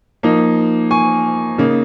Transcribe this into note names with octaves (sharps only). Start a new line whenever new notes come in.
F3 A#3 D#4
G#5 C#6
C#3 A#3 D#4